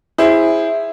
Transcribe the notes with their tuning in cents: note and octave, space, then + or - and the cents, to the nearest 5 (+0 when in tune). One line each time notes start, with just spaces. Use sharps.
E4 +0 G#4 -15 C5 +0